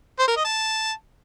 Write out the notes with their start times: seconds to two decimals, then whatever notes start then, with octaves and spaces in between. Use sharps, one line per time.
0.19 C5
0.28 A#4
0.36 D#5
0.45 A5